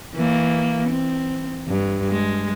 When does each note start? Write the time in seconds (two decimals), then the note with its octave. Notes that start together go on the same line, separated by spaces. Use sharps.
0.15 E3 A#3
0.89 C4
1.67 G2
2.08 G#3